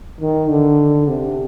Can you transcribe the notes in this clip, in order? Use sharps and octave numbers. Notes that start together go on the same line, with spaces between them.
D#3
D3
C3